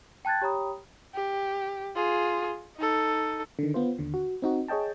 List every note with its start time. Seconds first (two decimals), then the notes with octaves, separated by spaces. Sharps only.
0.25 G5 A5 F#6 G#6 A6
0.42 G4 C#5 G5 A#5 B5 D#6
1.15 G4
1.96 F4 G#4
2.77 D#4 A4
3.59 D3 D#3
3.74 B3 F4 C5
3.99 D#2 D3
4.14 F#4
4.42 C4 D#4 F#4
4.68 G#4 C#5 D#5 G5 A5